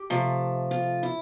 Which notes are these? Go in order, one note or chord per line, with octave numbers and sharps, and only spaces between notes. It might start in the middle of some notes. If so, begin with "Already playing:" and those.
Already playing: G4
C3 F3 A3
F4
E4